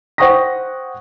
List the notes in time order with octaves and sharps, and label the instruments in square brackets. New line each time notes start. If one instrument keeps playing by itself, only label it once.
[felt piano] C5 F#5 G5 C#6 D#6 A#6